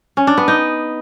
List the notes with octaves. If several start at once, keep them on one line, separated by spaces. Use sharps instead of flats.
C#4
D4
B3
D#4